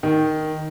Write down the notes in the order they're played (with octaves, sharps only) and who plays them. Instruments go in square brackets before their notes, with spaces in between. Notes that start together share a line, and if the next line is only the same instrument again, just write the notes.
[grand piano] D#3